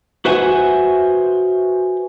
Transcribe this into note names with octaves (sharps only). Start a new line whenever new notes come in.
F#4 B4 C5 E5 F#5 G#5